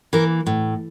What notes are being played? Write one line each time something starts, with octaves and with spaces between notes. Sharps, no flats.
E3 A#3 A#4
A2